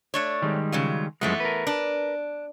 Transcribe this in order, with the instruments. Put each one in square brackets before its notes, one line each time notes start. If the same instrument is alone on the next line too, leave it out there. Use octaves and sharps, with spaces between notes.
[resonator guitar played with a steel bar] A3 D4 C#5
[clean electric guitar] D#3 G3 G#3
[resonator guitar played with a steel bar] C#3 F#3 F4
[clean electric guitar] F#2 F3 G#3 [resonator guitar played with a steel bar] E3 A3 B3
[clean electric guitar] A#4 B4
[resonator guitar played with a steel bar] D4